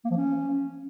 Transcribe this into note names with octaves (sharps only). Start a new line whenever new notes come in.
A#3
F3
C#4